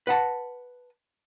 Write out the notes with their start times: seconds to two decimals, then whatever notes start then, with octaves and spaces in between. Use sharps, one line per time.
0.07 B4 F#5 A5